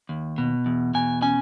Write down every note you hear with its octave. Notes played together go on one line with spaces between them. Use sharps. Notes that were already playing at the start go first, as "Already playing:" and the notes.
D#2
B2
E2
B2 G#5
C#4 G#5